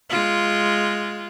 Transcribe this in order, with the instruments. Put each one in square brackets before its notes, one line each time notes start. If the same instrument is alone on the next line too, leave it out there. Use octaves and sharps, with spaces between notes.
[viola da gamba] G#3 F4